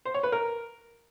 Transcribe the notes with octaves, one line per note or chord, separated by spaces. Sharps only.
C5
C#5
B4
A#4